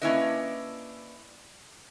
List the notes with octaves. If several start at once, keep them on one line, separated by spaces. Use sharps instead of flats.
A#3 C#4 D4 E4 B4 D#5